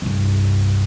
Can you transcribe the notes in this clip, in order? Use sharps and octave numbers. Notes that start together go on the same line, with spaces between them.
C2 G2